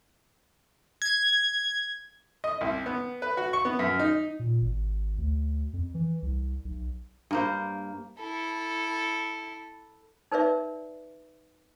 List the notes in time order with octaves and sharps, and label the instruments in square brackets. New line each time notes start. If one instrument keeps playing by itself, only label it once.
[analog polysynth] G#6
[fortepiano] D#5
C2
B3
B4
F#4
C#6
B3
F#2
D#4
[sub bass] A#2
G#1
D2
F2
E3
C2
B1
[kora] G2 A#3 C5
[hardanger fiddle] E4 A4
[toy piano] D#4 A#4 B4 D5 E5